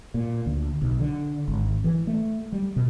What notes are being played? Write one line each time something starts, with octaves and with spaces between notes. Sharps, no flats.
A#2
D2
B1
D3
G#1
E3
A3
G3
B2